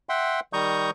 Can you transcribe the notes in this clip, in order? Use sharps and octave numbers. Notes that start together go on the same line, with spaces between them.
E5 F#5 G5 C6
D#3 G3 A#5 C#6 D#6 G6